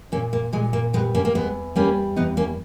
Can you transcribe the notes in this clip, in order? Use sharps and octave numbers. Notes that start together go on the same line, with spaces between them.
A#2 A#3 C#4
A#3
A#2 G#3
A#3
G3 G#3 B3
A#3 C#4
A#3
E2 G#3 B3
G3 A#3 C#4
E2 B3 D#4
A#3 C#4